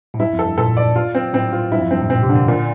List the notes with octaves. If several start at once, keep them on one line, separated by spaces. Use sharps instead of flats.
A2
G2 E4
F2
A4
G2
A#2 A4
D5
F4
C4
A2 C4
F4
G2 E4
F2
G2 C4
A2
A#2 C4
C3
D3
A#3
A#2